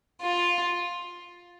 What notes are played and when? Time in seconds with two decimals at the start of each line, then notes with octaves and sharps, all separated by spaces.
0.22 F4